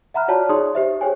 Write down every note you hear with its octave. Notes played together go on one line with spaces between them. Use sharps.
E5 F#5 A#5 B5 F6 F#6
F4 F#4 C#5 D5 A5
D#4 G#4 C#5 D5 C6 D#6
G4 C5 E5
G4 G#4 C5 C#5 G5 G#5